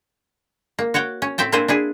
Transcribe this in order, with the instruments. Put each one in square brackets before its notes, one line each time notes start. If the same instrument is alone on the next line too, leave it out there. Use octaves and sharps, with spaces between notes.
[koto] A#3
F#4 C#5 F#5 G5
C#4
A2 C4 E5 G5 A5
A#3 C4 D4 E4 C5 G#5
D4 E4 G#4